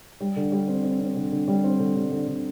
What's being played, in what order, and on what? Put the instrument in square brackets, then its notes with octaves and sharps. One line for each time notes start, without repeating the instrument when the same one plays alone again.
[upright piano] G3
D3
G3
C4
C4
C4
D3
D3
G3
C4
D3
G3
D3
D3